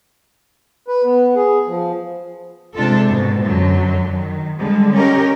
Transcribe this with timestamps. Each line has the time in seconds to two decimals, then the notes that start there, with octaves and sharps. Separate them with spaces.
0.88 B4
1.04 B3
1.35 G#4
1.67 F3
2.75 C3 G#3 D4 F4 A4
3.07 G#2 B2
3.44 F#2 D3 F#3
4.14 D#3
4.58 D3 G3 G#3
4.94 C#4 G4 A#4 D#5